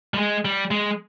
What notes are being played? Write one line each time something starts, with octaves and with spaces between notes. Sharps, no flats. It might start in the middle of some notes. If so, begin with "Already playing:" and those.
G3
G#3
G3
G#3